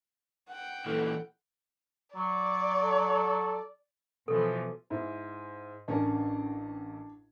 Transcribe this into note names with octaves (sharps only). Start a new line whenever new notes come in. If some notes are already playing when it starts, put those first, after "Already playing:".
F#5 G5
A#2 E3 A4 F6
F#3 D5
A4
B2 E3 F3 A4
G#2 E4
A1 C#4 D4 A#4